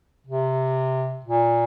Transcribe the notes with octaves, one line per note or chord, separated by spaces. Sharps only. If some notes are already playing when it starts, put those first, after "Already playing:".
C3
A#2